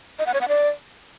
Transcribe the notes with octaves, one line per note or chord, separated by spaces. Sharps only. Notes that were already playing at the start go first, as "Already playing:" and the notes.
D#5
F#5
C#5
F#5
D5